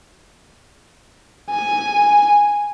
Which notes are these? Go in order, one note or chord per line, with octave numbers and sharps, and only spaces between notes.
G#5